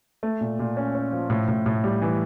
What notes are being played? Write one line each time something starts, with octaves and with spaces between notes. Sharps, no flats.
A3
A#2
A#2
C#4
C#4
F3
A2
A2
A2
G3
E3